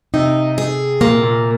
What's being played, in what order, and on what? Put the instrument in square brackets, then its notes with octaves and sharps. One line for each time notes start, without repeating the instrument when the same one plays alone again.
[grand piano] C3 [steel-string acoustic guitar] D#4
[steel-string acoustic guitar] G#4
[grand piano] A#2 [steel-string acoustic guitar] A#3
[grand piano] A#2